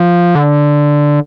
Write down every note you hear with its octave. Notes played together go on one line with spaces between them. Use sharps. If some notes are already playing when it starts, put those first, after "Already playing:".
Already playing: F3
D3